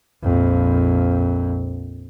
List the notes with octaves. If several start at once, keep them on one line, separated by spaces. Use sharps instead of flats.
A#1 F2